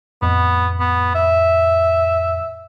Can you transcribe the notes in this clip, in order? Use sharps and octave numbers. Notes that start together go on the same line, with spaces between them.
F2 A2 B3
B3
E5